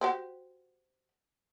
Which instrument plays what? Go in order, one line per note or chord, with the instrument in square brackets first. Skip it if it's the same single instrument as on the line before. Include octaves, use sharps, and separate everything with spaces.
[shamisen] F#4 G4 C5